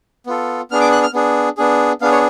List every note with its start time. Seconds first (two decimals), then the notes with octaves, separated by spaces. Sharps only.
0.26 B3 F4 A4
0.71 B3 D4 G#4 F6
0.81 D6
0.92 F#6
1.03 F6
1.13 B3 D4 G#4
1.57 B3 D4 G#4
2.01 B3 D4 G#4 F5
2.11 C#5